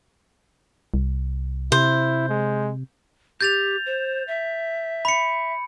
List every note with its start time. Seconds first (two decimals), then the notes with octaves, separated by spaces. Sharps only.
0.94 C2
1.72 C3 E4 C5
2.29 G#3
3.41 G4 G6 A6 F7
3.86 C5
4.27 E5
5.05 B5 C#7